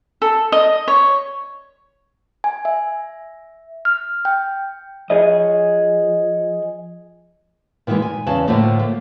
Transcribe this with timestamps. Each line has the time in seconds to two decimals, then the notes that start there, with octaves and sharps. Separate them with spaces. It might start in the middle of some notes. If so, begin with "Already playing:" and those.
0.22 A4
0.52 D#5
0.88 C#5
2.44 G#5
2.65 E5
3.85 F6
4.25 G5
5.10 F3 G#4 C#5 D#5
7.87 A#2 D#3 E3 F#3 G#3
8.02 G#5
8.26 E2 C#3 A5
8.47 A2 D3 F3 A3 A#3
8.79 A#3